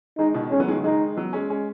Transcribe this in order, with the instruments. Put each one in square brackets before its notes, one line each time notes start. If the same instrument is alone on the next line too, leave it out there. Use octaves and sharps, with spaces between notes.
[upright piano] D#3 G#3 [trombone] D#4
[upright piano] B2 D#3
[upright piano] D#3 G#3 [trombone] C#4
[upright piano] F#3 B3
D#3 G#3
C#3 F#3
[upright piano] D#3 G#3 [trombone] D#4
[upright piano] F#3 B3
G#3 C#4
G#3 C#4